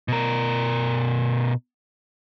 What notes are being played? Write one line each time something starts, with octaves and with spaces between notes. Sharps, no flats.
B2 A#4